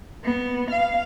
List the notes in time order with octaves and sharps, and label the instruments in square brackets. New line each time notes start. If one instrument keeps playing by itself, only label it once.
[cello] B3
F5